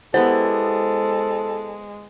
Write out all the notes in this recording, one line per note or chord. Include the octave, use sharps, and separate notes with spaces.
G#3 B3 E4 G4 A4 C5